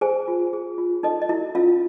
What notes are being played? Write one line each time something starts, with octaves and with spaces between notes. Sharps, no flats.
G#4 C5 G#5
F4
G#4
F4
D#4 A4 D#5
D#5
E4 F#4 E5
C#4 F4 F5